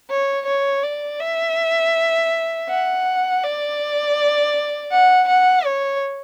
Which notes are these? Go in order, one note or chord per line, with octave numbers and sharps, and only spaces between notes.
C#5
C#5
D5
E5
F#5
D5
F#5
F#5
C#5